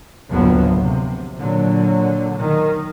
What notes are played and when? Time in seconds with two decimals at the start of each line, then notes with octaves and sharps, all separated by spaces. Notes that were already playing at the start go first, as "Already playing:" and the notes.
0.29 F#1 D2 A2 F3 F#3 B3
0.80 C3
1.37 A#2 D3 F#3
2.37 D#3